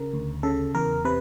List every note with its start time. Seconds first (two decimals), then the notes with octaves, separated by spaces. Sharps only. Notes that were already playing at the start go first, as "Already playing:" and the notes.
Already playing: C#3 A#4
0.14 D2
0.43 C#3 A4
0.75 E2 A#4
1.05 C3 B4